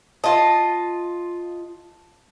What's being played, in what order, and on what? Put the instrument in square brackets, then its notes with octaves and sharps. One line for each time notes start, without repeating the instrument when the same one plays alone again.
[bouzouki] F4 D#5 [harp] A5